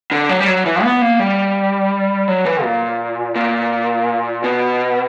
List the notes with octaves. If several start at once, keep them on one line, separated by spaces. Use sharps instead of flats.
D3
F#3
G3
F#3
E3
B3
A#3
G3
F#3
E3
A#2
A#2
B2